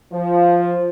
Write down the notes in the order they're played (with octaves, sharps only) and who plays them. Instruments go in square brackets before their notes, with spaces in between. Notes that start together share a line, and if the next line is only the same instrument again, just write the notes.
[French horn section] F3